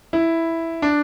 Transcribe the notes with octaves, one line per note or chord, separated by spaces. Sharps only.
E4
D4